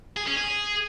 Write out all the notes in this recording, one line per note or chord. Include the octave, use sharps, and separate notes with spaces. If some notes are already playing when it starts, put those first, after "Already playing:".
G#4
C#4
G#4